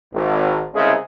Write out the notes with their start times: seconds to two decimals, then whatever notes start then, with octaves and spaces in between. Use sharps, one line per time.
0.13 G#1
0.75 C2 C#3 G#3 E4 G#4